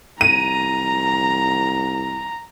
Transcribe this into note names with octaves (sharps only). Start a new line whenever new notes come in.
C2 A#5 D#7